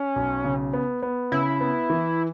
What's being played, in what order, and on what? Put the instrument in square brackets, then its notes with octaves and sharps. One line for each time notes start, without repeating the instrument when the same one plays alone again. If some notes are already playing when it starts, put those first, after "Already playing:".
Already playing: [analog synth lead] C#4
[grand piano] B1
C#3
B3
B3
[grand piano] C#3 [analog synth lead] E4
[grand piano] B3
E3